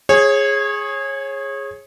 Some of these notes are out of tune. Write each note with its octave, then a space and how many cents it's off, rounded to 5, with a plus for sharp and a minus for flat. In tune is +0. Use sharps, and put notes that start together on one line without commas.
G#4 +0 C#5 -25